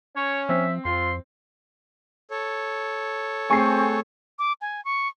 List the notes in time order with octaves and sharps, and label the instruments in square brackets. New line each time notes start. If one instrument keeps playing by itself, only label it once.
[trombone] C#4 [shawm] C#5
[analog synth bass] F3 [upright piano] C4 [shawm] E5
[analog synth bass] F2 [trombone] F4 [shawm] C6
[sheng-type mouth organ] A4 C#5
[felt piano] A3 G#4 C7 [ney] C4 [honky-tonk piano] G#5 C#6
[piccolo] D6
G#5
C#6